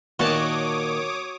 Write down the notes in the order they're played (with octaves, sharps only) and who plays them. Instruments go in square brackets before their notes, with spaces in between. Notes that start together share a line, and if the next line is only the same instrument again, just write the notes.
[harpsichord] A#2 D#3 [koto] F#4 A5 [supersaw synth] C#5 D6 D#6